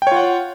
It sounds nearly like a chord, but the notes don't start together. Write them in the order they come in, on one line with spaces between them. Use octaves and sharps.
G5 C#5 F4 F#5